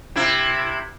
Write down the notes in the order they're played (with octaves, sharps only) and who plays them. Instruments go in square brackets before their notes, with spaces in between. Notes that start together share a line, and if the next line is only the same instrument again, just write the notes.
[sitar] C3 E4